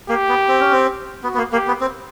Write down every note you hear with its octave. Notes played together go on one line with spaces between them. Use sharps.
A#3 G4
B3
C4
C#4
C4
B3 F#4
B3
A#3
A#3 G4
B3
C4